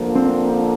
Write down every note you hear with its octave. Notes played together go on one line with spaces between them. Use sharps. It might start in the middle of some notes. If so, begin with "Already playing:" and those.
Already playing: D3 F3 A#3
C4